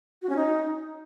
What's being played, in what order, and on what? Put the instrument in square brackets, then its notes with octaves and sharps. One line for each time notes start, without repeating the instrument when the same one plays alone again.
[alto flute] F#4
C#4
D#4